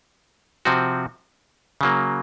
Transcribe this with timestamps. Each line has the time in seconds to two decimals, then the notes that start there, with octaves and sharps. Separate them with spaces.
0.65 C3 F3 C4 F#4
1.81 C#3 F#3 A#3